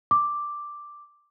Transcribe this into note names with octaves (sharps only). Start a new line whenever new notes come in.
D6